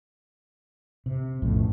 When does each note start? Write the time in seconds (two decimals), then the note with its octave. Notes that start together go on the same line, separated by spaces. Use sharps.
1.06 C3
1.42 B1 F2 A2 C#3